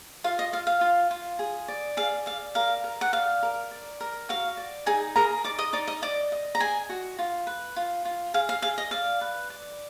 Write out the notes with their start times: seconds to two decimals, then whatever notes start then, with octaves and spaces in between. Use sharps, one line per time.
0.24 F4 F5
0.39 D#5
0.53 F4 F5
0.67 F5
0.81 F4
1.11 F4
1.39 G#4
1.68 D5
1.97 G#4 F5
2.26 D5 F5
2.55 A#4 F5
2.84 A#4
3.01 F#5
3.13 D5 F5
3.43 A#4
3.71 D5
4.01 A#4
4.29 F#4 F5
4.57 D5
4.86 D#4 G#4 G#5
5.16 G#4 A#4 A#5
5.44 D#4 D5 D6
5.59 D#5 D#6
5.73 D#4 D5 D6
5.87 D#5 D#6
6.02 D5 D#5 D6
6.32 D#5
6.55 A#5
6.60 G#4 D#5 G#5
6.89 F#4
7.19 F4
7.47 B4
7.76 F4
8.05 F4
8.34 G#4 F5
8.49 F5
8.62 G#4 F5
8.78 D#5
8.91 D5 F5
9.21 B4
9.50 D5